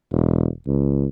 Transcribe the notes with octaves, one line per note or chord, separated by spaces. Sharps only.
E1
C#2